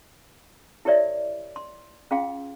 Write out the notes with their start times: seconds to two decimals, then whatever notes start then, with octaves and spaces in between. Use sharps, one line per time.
0.85 E4 G4 A#4 C#5 D5 E5
1.56 C6
2.11 C#4 F4 G#4 F5 G5 C6